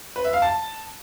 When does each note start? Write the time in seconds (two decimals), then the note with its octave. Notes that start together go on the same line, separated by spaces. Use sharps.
0.16 B4
0.25 E5
0.33 F5
0.42 A5